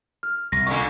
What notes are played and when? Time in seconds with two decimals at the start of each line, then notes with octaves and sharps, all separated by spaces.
0.23 F6
0.52 C2 A#6
0.67 A#2 D3 C#6